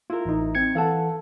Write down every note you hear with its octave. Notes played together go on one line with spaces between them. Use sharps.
E4 F4 A#4
A1 D#4
C4 G#6 C#7
E3 A4 F5 F#5 A5